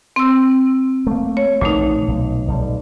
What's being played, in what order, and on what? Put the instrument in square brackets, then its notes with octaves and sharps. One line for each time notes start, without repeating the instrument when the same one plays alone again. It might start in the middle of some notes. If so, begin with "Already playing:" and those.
[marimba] C4 E6
[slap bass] A3 A#3
[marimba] C#5
[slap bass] A#1 D3 E3 [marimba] A#2 A3 D#4
[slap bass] B1
B1 G3